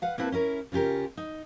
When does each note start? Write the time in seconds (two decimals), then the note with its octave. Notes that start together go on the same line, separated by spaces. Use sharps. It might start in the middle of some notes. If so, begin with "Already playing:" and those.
0.02 B4 F5 F#5
0.18 A#3 C4 E4 B4 A5
0.32 C#4 E4 A#4
0.72 C#3 C#4 F4 G4 A#4
1.17 D#4